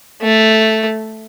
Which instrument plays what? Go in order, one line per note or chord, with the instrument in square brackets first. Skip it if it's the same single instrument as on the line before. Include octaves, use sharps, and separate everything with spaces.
[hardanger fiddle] A3